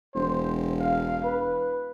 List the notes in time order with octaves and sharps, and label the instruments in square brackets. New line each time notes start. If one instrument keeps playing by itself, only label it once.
[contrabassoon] E1 [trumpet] C5
[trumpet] F5
B4